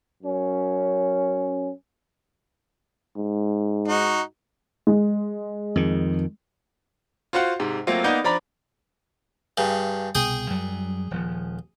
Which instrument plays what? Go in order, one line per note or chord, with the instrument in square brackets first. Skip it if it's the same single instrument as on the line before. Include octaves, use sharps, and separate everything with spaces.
[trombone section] F#2 C#4
[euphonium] G#2
[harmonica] D#4 F#4
[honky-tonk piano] G#3
[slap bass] F2 D#3
[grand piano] F4 F#4 C5 F5 F#5
G#2 C3
F#3 A3 A#3 C4 F4
A#3 B3 D#4 D5 G6
F3 D4 D5 A#5 B5 A6
[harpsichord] G2 C#3
[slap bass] C2 B2 [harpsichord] G#4 G5 D#6
[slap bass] F#2 F#3 G3
D#1 F3